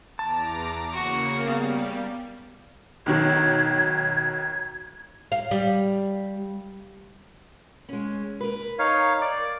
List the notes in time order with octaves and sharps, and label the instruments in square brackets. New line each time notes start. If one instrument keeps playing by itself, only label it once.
[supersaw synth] E2 A#5 D6 [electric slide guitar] A5
[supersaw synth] C#3 A#3 [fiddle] F#4
[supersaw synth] G3 [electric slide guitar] B3 [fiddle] F5
[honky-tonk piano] B1 D#3 F#3 [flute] G#6
[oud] F5
G3
[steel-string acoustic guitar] G#3 C#4
A#4 B4
[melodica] D#4 C#5 F5
D5 D6